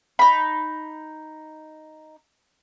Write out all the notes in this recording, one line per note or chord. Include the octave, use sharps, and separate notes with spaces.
D#4 B5